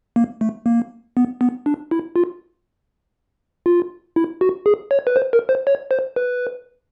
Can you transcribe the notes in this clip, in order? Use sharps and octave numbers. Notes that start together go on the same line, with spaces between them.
A#3
A3
A#3
B3
B3
D4
E4
F4
F4
E4
F#4
G#4
C#5
B4
C5
A#4
C5
C#5
C5
B4